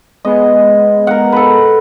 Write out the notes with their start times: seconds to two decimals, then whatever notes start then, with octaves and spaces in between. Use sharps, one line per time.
0.25 G#3 B3 D#5
1.07 A#4 F#5
1.32 A4 B4